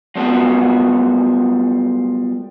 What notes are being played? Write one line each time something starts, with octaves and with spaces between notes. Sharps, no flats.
F#3 G3 A3 B3 F4 F#4